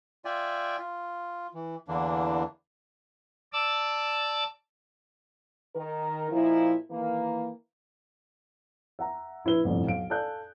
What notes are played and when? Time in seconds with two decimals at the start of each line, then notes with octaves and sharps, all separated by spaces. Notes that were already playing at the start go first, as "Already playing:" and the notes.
0.25 F4 D5 E5 G5 G#5
0.78 F4
1.54 E3
1.88 E2 D3 E3 A#3 D4
3.53 D5 A5 D6 E6
5.76 D#3 A#4
6.31 A#2 F3 D#4 E4
6.91 D#3 E3 A#3
8.99 E5 F#5 A#5
9.45 A#1 E4 B4 G7
9.64 G1 C2 F2 A2
9.86 B1 F5 D7
10.10 A4 D5 F5 G#5 F#6 G6